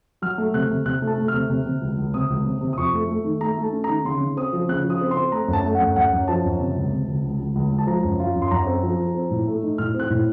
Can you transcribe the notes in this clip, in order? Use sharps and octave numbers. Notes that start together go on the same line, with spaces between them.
F#3 F6
A3
C3 F#6
C3
C3 F#6
A3
A5
A3
F6
C3
C3
C3
C#2
C#2
C3 D#6
C#2
C3
C3
D#6
F2 C#6
A3
A3
D#3
A3 A#5
A3 A5
C#4
D#3 A#5
C#3 C6
C#3
C4 D#6
F3
C#3 F#6
F3
D#6
C4
C6
C4
A3 A#5
F#2
A5
A3
F#5
F#2
F#2 F#5
F#2
F3 A5
F#2
C3
C#2
C3
C#2
C#2
C#2
C#2
C#2
A5
F3 A#5
F#2
F4
F#2
C6
F#2 A#5
C4
F3
F3
C4
A2
A3
D#4
A2 F6
C4
F#6
A2